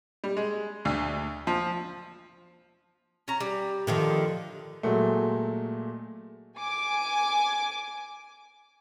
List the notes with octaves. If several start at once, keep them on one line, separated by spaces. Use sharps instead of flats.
G3
G#3
D2
F3
C#4 A#5
G3
D3 D#3 F3
A#2 F#3 G#3 A3
G#5 D6